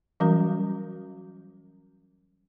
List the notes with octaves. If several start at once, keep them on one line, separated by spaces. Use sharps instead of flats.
E3 F#3 G3 C#4 F#4 A#4